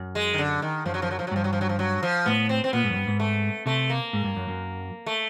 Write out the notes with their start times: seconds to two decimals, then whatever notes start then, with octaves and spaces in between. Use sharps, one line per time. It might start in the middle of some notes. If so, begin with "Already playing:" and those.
Already playing: F#2
0.15 G#3
0.34 D#3
0.38 D3
0.62 D#3
0.86 F#2 F3
0.94 F#3
1.02 F3
1.11 F#3
1.19 F3
1.27 F#3
1.31 G2 F3
1.44 F#3
1.53 F3
1.61 F#3
1.69 F3
1.79 F#3
2.03 F3
2.26 A2 B3
2.49 C4
2.64 C4
2.73 A#2 B3
2.84 G#2
2.90 F#2
2.96 G2
3.07 G#2
3.20 A3
3.66 C3 A3
3.90 A#3
4.13 G#2
4.24 G2
4.36 F#2
4.48 F#2
5.06 A3